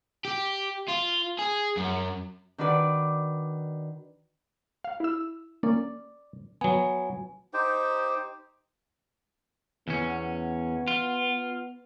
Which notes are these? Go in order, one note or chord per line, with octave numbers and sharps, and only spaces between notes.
G4
F4
G#4
F#2
D#3 D4 F#4 B4 D5
F5
E4 E6
A#3 C#4 D5
F#3 B3 G#5
D#4 G4 C5 G5
E2 B3 C#4
F4